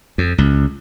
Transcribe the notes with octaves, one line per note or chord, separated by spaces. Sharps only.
F2
C#2